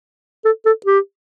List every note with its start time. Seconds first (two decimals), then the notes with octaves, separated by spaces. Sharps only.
0.45 A4
0.65 A4
0.86 G4